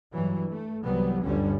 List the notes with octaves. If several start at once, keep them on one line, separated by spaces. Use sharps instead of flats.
G2 E3 F#3
A3
C2 E3 F#3 G3 B3
G1 D2 G2 D3 G3 C#4